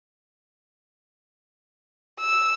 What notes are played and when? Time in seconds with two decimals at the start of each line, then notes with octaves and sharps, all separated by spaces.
2.20 E6